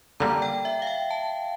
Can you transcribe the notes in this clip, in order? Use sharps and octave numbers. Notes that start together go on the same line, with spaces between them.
D3 G3 A#3 A#5
G5
E5
F5
G5
A5